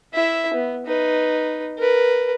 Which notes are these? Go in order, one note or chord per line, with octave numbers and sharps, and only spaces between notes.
E4 E5
B3
D#4 B4
A#4 B4